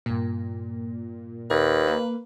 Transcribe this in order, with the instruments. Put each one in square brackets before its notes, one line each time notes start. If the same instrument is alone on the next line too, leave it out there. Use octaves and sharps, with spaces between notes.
[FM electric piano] G2 A#3 [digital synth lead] A#2
[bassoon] D#2 [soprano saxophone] B4
[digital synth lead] A#3